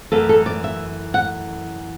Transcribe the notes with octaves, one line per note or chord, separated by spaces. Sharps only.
F#2 E3 A3 A4
A4
D5
E5
F#5